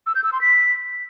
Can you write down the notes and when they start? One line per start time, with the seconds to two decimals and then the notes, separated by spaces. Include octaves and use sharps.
0.07 E6
0.15 G6
0.24 E6
0.33 C6
0.41 B6